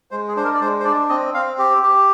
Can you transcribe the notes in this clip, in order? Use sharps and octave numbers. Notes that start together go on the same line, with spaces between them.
G#3 C5
G#4
D4 C5
A#4
D5
G#3 C5
C5
D4 D5
C4 D#5
C4 F5
G4
G4